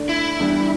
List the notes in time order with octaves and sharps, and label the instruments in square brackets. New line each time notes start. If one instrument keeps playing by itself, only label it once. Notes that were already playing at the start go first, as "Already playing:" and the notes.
Already playing: [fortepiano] D3 A3 D4
[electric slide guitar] E4
[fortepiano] E2 D3 G3 D4